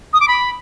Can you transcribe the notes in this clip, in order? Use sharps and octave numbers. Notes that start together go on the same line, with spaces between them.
D#6
D6
B5